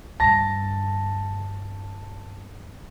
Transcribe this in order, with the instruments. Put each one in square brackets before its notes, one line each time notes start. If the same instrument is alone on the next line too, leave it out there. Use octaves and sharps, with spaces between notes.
[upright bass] G2 D3 [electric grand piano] A5 A#6